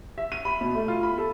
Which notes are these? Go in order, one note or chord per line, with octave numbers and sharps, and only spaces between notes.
E5
D#7
B5
B2
A3
F4
B5
A4